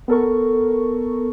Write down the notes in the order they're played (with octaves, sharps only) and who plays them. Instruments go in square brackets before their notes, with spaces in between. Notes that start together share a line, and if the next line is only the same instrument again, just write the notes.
[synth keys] B3 A4 A#4 C#6